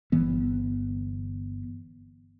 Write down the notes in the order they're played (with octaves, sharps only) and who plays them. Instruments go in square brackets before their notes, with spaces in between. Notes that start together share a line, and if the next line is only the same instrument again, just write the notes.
[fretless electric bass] G1 E3 B3